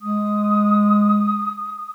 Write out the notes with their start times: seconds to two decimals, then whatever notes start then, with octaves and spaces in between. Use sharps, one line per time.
0.01 G#3 D#6